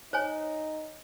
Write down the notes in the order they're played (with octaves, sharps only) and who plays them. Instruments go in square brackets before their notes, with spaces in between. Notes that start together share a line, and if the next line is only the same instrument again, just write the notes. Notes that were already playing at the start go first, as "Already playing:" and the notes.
[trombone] D#4 [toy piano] C5 C#5 G#5